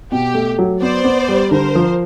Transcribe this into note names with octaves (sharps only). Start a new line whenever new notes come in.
B2 G4
A3
F#3
B3 C5 D5
B3
G3
D3 A#4 C5
F3